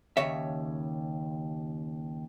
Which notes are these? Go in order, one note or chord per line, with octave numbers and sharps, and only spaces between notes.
D#2 C#3 C#5 E5